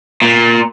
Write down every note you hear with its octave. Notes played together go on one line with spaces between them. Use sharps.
A#2